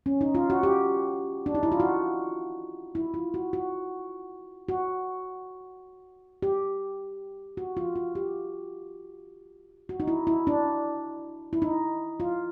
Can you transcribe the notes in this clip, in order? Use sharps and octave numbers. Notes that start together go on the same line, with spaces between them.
C#4
D#4
F4
F#4
G4
D4
D#4
E4
F4
F#4
E4
F4
F#4
F#4
F#4
G4
F#4
F4
F4
G4
F#4
D#4
E4
E4
D4
E4
D#4
F4